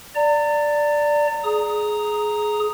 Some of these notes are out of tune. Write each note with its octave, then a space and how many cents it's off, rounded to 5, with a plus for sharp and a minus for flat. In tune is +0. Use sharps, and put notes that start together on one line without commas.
D5 +0 A#5 -35
G#4 +20 A#5 -5 D#6 +0